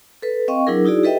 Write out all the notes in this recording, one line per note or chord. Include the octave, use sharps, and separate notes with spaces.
A4 B4
C4 D#5 F5 G5 C#6
F#3 D4 E4 G#4 A#4
D#4 E4 F#4 G#4 D5
G4 A4 B4 D#5 E5 G5